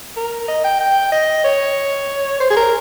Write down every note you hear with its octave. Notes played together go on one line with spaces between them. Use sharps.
A#4
D#5
G5
G5
D#5
C#5
C5
G#4
A#4